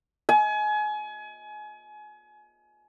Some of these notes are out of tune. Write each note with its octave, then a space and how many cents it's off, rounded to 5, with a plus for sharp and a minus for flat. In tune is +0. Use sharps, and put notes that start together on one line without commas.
G#5 +30